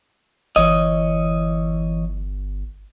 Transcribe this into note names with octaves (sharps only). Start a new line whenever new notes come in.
G1 E3 C#5 D#5